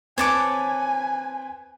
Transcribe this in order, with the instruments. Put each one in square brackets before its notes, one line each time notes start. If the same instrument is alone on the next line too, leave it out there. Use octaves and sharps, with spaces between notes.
[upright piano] C4 B4 [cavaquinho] C#5 A5 D6 [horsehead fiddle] G#5